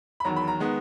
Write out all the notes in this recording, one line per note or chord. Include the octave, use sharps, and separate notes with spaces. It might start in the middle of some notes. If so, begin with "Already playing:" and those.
B5
E2 D#3 F#3 A#5
B5
A#5
D#3 G#3 B3